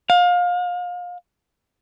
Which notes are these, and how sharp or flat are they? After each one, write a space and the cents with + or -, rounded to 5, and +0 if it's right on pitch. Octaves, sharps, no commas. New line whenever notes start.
F5 +30